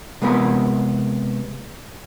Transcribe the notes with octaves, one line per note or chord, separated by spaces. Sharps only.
C3 G#3 B3 A#4 B5